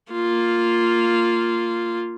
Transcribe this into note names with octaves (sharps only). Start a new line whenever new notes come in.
A#3 F4